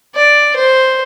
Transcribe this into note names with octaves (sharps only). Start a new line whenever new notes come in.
D5
C5